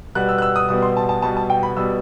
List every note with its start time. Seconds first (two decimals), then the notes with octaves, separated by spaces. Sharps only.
0.15 B2 G3 B3 F#6
0.29 E6
0.38 F#6
0.42 E6
0.56 D#6
0.69 B2 G3 B3 D#6
0.82 C6
0.97 A5
1.09 A5
1.22 B2 G3 B3 A5
1.37 A5
1.50 G5
1.63 B5
1.77 B2 G3 B3 E6